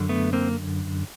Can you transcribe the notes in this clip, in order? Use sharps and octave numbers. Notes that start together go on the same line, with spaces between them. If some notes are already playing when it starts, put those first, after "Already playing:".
Already playing: F#2 D3
A3 B3
A#3 C4